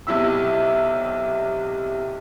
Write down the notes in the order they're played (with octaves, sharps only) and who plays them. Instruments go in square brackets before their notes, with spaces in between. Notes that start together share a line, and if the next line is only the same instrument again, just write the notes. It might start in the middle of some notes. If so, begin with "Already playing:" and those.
[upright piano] B1 C3 E4 E5 E6